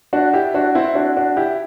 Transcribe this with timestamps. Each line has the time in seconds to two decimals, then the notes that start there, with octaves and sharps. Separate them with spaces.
0.13 D4 F#4
0.33 E4 G4
0.54 D4 F#4
0.75 C4 E4
0.95 D4 F#4
1.17 D4 F#4
1.37 E4 G4